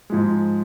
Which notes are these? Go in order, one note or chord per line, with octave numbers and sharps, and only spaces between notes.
G#2 F3 G#3